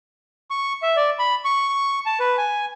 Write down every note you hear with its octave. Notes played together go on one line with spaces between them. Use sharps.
C#6
E5
D5
B5
C#6
A5
B4
G#5